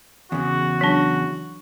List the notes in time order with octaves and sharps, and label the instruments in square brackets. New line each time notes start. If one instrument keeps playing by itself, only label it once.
[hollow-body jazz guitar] E2 C#3 [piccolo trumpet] F#4
[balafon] F#3 D4